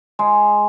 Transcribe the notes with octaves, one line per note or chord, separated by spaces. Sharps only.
G#3